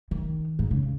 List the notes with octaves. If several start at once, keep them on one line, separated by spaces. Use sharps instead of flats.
D#3
G#2
C#3